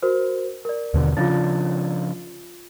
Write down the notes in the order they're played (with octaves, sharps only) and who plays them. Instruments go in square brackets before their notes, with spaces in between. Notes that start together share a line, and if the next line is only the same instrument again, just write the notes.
[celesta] F#4 A#4 C5
A#4 D5
[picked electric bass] D#2 B2 D3
[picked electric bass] C#3 F3 D4 [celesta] F4 A6